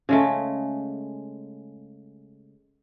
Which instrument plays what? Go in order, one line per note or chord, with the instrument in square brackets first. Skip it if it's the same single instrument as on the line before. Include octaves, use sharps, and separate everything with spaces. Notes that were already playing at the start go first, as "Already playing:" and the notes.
[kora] C#3 G#3 A3